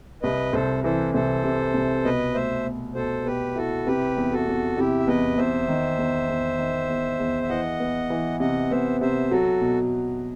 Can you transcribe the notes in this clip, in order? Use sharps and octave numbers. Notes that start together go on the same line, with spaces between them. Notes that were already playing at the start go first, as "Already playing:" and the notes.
C2 B4 D#5
C2 A4 C5
E3 A4 C5
C2 A4 C5
C3
C2
B2 B4 D#5
A3 C5 E5
B2
B2 A4 C5
B2 G4 B4
E4 F#4 A4
C3 G4 B4
E2
F#4 A4
E2
C3 E4 G4
E5
E2 B4 D#5
E2 C5 E5
D#3
E2
E2
D#3
E2
E2
E5
E3 D#5 F#5
B3
E3
C3 D#5 F#5
B3 C5 E5
C3 C5 E5
F#3 F#4 A4
B2